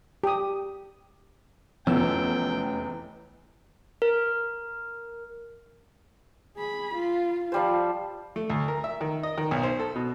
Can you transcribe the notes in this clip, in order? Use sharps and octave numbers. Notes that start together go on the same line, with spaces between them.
G4 D#6
F1 E2 F3 A3 B3 C#4 G5 E6
A#4
G#4 B5
F4
F3 G3 C5
A3
D2
A#4
E5
D#3
D#5
D#3
B1
C5
A4
B2